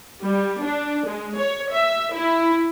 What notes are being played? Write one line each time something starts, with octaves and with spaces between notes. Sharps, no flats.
G3
D4
G#3
C#5
E5
E4